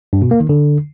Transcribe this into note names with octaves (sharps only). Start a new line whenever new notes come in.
G2
B2
A#3
D#3
D3